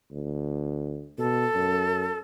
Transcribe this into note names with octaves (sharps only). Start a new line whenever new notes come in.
D2
B2 A4
F#2